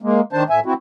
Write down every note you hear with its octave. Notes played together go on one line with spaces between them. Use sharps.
G#3 A#3
D#3 D4 C5 A5
A2 E5 G#5
C4 E4 F#4